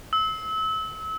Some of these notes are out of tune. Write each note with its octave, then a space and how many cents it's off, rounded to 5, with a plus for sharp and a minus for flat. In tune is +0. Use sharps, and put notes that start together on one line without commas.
E6 -30